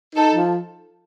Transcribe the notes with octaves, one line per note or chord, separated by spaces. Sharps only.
D#4 A4
F3